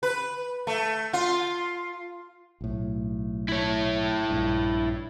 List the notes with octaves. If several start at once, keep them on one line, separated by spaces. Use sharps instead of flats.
B4
A3
F4
B1 A2
E4 C#5
A#1 G2